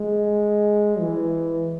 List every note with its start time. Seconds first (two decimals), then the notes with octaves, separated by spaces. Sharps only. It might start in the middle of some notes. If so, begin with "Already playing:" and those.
Already playing: G#3
1.00 E3